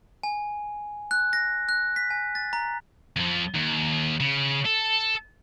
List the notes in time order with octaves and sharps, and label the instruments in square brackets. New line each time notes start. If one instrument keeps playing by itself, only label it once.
[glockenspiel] G#5
F#6
A#6
F#6
B6
G#5
A6
A#5
[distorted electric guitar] F2 F3
D#2
C#3
A4